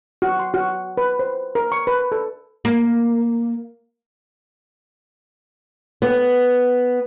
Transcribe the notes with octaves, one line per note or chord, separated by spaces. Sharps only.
F#4
C6
F#4
B4
C5
A#4
C#6
B4
A4
A#3
B3